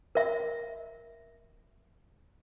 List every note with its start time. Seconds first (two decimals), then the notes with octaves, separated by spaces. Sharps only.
0.15 A#4 E5